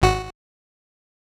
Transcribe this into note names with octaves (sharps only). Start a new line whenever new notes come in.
G#1 F#4